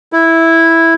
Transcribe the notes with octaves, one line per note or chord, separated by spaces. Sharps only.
E4